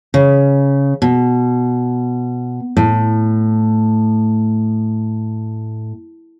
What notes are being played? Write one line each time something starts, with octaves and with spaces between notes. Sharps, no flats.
C#3
B2
A2